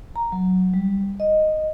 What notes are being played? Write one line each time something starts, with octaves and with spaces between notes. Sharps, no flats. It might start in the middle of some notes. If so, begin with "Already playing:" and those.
A#5
F#3
G3
D#5